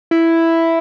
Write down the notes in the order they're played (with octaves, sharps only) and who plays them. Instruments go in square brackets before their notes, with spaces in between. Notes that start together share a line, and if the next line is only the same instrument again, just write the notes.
[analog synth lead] E4